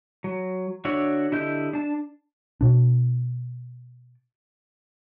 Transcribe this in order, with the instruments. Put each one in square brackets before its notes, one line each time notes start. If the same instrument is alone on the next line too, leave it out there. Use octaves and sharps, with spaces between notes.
[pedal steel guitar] F#3
D3 D4 F#4 C#5 E5
D3 E4 G4 D#5 G6
D4 A5
[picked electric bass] B2 D4